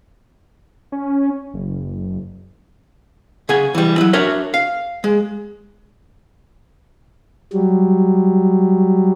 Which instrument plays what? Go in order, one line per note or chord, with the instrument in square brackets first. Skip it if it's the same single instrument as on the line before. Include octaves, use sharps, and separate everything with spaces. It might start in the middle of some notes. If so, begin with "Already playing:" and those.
[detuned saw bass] C#4
F#1
[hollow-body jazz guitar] C#3 G#4 F#5 G#5
E3 G3
F#3 E4
D4 F#4 A#4 C#5 E5
F5
G#3
[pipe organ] F#3 G3